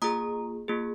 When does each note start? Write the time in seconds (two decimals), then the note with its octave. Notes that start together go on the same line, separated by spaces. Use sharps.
0.02 A#3 F4 G#4 A#5 D#6
0.68 A#3 F4 G#4